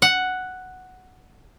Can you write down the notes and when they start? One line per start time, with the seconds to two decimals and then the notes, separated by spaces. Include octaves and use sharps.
0.02 F#5